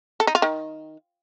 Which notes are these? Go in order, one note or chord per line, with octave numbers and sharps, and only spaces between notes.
A4
D#4
F4
D#3